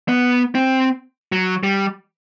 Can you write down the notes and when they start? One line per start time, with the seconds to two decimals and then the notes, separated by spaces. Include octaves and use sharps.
0.09 B3
0.55 C4
1.32 F#3
1.63 G3